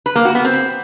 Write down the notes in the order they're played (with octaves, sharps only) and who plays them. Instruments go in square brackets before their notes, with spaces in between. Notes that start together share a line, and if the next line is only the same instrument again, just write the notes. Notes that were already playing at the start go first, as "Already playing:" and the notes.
[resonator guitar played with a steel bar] B4
A#3
F#4
B3
C4